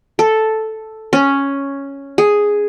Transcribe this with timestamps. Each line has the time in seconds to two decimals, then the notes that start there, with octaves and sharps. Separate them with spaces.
0.19 A4
1.13 C#4
2.18 G#4